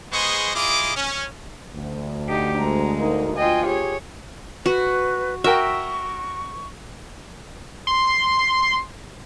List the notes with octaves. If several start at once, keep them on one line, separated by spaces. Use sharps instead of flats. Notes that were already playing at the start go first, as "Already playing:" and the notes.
G#3 B3 G#4 C5 D#5 C#6
E4 F4 G#4 D#5 D6
C#4
D2
D#4 G4
G#3 A#5
A#3 D#4
F4 D#5 G5 G#5
G4 G#4 C#5
F#4 B4
F#4 A#4 E5 G5 C#6
C6